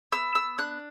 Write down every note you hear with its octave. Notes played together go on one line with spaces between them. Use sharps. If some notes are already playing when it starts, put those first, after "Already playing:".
B3 E6
E6
D4 F#6